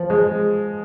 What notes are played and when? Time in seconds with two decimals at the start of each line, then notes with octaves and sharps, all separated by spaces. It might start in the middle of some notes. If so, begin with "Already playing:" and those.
Already playing: F3
0.10 G#3